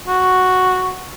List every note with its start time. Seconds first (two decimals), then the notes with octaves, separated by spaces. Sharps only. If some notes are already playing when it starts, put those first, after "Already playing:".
0.08 F#4